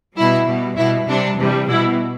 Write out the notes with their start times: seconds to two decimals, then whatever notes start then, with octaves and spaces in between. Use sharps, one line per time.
0.16 B2 G3 E4
0.47 B2 G3
0.78 B2 G3 E4
1.08 C3 G3 D4
1.39 C3 E3 G3
1.69 B2 G3 E4